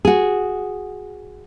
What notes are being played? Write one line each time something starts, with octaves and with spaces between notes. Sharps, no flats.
F#4 G#4